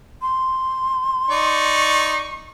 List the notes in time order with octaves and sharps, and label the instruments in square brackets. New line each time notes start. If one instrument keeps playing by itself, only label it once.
[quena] C6
[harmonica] D#4 D5 [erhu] C#6